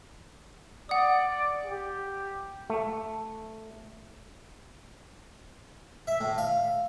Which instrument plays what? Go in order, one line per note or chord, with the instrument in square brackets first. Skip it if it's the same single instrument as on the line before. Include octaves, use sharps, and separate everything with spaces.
[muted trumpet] D5 [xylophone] F#5 D#6
[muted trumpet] G4
[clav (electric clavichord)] A3
[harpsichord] E5
A2
F5